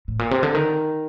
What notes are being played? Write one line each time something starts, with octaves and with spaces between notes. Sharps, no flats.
A2
A#2
C3
D3
D#3